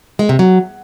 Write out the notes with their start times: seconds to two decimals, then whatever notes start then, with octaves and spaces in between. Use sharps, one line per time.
0.19 G#3
0.29 C3
0.39 F#3